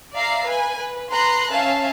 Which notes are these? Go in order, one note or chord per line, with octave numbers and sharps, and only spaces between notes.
D5 E5 F5 A#5 C7
B4 G#5
B4
B4 A#5 C6 F#6
C#4 E5 F5 A5